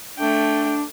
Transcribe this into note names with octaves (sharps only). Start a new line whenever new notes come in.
A3 D4 G5